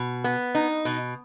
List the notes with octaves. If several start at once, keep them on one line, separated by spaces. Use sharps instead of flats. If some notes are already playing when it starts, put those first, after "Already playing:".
Already playing: B2
B3
D#4
B2